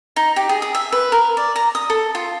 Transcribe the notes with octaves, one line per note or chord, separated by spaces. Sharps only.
D#4
G4
G#4
G#4
E5
B4
A#4
D5
A#5
D#6
A4
F4